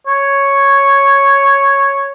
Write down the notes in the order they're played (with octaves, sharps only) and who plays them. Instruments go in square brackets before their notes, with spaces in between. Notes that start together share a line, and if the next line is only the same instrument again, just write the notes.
[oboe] C#5